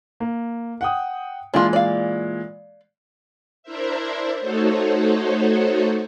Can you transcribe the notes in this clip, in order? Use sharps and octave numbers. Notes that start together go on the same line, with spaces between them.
A#3
F#5 G5 D#6
A#2 E3 G#3 D4 F4
D5 F5
D4 E4 A#4 C5 E5
A3 D#4 F#4 A4 C5 C#5